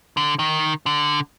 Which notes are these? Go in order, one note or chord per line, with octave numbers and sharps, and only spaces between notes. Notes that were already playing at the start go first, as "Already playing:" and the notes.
D3
D#3
D3